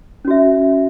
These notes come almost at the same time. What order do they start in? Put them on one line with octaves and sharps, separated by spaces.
C#4 F#4 E5